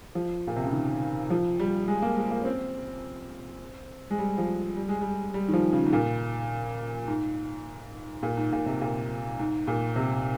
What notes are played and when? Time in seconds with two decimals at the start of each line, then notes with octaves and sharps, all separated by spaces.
0.15 F3
0.47 A#2
0.56 C3
0.64 C#3
0.72 D#3
1.30 F3
1.59 G3
1.88 G#3
2.02 A#3
2.17 G#3
2.31 A#3
2.42 C#4
2.45 C4
4.11 G#3
4.18 G3
4.38 F3
4.77 G3
4.89 G#3
5.01 G3
5.34 G3
5.48 D#3
5.53 F3
5.72 C#3
5.86 G#2
5.93 A#2
7.08 G#2
8.23 A#2
8.37 G#2
8.52 A#2
8.66 C3
8.81 A#2
9.39 G#2
9.67 A#2
9.96 C3